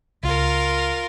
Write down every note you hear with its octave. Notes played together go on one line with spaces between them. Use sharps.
C#2 F4 A#4